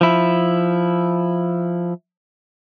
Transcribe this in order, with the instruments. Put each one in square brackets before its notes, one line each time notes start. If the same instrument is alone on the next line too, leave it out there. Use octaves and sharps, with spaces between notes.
[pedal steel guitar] F3 E4